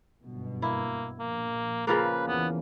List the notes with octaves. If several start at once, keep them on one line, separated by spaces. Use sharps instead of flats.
G1 F#2 B2
A#3 E4
A#1 A#3
C#3 F3 A#3 B4
E2 E3 B3